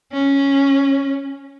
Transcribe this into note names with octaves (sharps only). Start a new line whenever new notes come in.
C#4